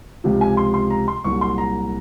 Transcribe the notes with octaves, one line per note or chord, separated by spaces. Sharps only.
C#2 C3 F3
G#5
C6
C6
A#5
C6
C2 A#2 F#3 C#6
C6
A#5